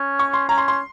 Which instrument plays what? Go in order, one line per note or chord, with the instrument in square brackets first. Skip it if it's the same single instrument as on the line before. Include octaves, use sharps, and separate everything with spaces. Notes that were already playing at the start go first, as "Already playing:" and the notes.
Already playing: [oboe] C#4
[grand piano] C#6
C6
[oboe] C#4 [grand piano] A#5
[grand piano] C6
C6